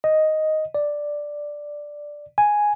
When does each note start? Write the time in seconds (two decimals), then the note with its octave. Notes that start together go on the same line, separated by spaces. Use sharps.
0.04 D#5
0.75 D5
2.38 G#5